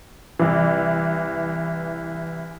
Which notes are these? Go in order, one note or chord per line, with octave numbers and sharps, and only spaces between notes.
C2 E3